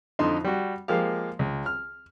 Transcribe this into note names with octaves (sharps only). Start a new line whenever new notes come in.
F2 D3 D#4 E4 E5 C6
G3 F#4
F3 G#3 A#3 G4 F5
C#2
F6